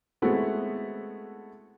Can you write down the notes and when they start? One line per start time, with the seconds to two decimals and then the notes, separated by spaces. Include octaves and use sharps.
0.22 G#3 A3 B3 C4 E4 F#4